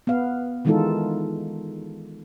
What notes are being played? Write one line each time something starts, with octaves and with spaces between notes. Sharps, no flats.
B3 F5
D#3 E3 G#3 D#4 F4 A4